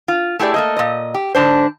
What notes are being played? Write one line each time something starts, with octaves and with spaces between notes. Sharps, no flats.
F4
A3 E4 G4 G#4 D5
A3 A#3 D#5
A#2 D#5
G4
G#2 D3 D4 C5